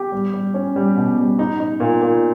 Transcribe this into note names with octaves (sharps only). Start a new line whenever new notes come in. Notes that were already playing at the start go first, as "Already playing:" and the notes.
Already playing: G4
G3
G3
C#4
G3
B2
G3
D#4
D#4
A#2
A#2